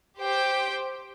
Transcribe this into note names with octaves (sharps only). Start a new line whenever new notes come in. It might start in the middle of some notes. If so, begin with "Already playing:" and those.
G4 C5 G5